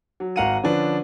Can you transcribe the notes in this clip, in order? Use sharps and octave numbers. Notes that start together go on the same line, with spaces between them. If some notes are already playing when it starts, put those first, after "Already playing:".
F#3
G#1 F#4 F5 F#5 A#5 D#7
D3 F3 C#4 D4 B4